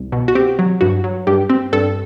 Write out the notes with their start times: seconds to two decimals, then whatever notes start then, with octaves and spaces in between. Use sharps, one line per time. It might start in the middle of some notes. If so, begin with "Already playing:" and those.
Already playing: C2
0.12 B2
0.28 F#4
0.35 C4 G4
0.59 F#3
0.81 G2 F#4
1.04 F#3
1.27 G2 G4
1.50 C4
1.73 G2 A4